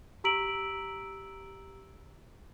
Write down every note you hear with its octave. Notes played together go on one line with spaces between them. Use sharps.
G4 A#5 E6 B6 D7 F#7